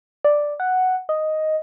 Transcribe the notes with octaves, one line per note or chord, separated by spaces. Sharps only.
D5
F#5
D#5